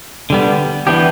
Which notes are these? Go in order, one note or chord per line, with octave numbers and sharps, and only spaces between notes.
D3 G3 B3
E3 B3 D4 G4